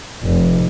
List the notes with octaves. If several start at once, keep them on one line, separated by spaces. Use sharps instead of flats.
F1